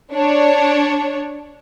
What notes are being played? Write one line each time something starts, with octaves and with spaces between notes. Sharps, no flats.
D4 C#5